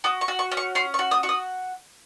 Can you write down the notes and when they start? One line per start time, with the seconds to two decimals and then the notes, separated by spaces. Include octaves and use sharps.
0.04 F#4 D#6
0.21 C#6
0.28 F#4
0.39 C#6
0.52 C#4
0.57 C#6
0.75 C#4 C6
0.94 C#6
0.99 F#4
1.11 D#6
1.23 F#4 C#6
1.29 D#6